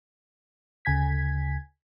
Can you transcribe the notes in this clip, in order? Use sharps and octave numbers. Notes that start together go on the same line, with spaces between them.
D2 C#3 G#5 G#6 B6